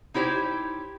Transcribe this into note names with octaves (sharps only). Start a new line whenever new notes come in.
D#4 E4 G4 C5 C#5